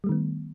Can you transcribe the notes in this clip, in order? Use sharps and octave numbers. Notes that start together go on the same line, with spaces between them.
D#3 G3 A3 B3